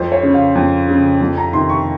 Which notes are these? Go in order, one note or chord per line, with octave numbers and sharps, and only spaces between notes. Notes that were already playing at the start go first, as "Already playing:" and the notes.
Already playing: F2 C5
C#5
C#3
F5
F2
C#3
F2
A#5
C3 D#3 C6
C#6